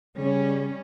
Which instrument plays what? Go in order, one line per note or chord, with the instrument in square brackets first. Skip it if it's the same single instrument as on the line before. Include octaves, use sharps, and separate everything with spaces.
[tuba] C#3 [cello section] G3 C#4